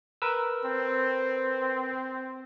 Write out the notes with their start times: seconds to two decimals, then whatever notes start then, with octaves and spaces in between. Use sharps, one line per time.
0.22 A#4 B4 E6
0.65 C4